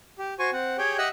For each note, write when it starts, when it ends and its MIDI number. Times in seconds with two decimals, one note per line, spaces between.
0.19 0.34 67
0.39 0.50 66
0.39 0.50 72
0.39 0.50 80
0.39 0.50 85
0.53 0.77 60
0.53 0.77 78
0.78 0.97 67
0.78 0.97 68
0.78 0.97 73
0.78 0.97 79
0.98 1.09 67
0.98 1.09 75
0.98 1.09 76
0.98 1.09 78
0.98 1.09 88
0.98 1.09 90